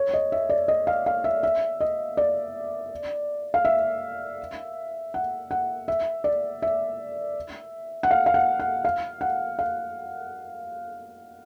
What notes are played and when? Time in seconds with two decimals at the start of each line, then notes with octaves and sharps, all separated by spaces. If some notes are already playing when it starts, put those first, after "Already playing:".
Already playing: C#5
0.14 D#5
0.32 E5
0.50 D5
0.68 D#5
0.87 F5
1.06 F5
1.24 E5
1.43 E5
1.80 D#5
2.17 D5
3.54 F5
3.65 E5
5.14 F#5
5.51 F#5
5.88 E5
6.24 D5
6.62 E5
8.03 F#5
8.11 F5
8.26 F5
8.34 F#5
8.59 F#5
8.85 F5
9.21 F#5
9.59 F5